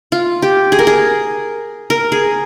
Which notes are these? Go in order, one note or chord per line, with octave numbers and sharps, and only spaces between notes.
F4
G4
G#4
A#4
G#4
A#4
G#4